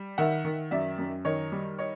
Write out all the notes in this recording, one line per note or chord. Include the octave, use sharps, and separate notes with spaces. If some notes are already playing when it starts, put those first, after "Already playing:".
Already playing: G3
D#3 E5 F#5
D#3
F#2 D5 E5
F#2
D#3 C#5 D#5
G3
C#5 D#5